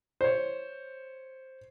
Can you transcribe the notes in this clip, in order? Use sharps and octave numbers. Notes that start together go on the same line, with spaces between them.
C5 C#5